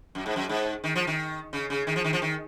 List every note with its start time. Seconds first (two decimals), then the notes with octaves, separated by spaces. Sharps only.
0.15 F#2
0.26 G#2
0.36 F#2
0.49 G#2
0.84 D#3
0.96 F3
1.07 D#3
1.53 C#3
1.70 C#3
1.87 D#3
1.96 F3
2.04 D#3
2.13 F3
2.22 D#3